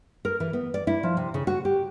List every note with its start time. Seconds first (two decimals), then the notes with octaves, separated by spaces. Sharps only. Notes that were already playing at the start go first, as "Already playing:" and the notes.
0.25 A#4
0.40 E3
0.53 B3
0.74 D5
0.87 E4
1.03 F3
1.17 C3
1.34 C#3
1.47 F#4
1.65 G4